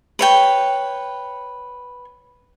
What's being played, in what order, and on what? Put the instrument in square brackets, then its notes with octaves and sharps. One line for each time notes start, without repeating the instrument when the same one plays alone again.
[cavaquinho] B4 C#5 G5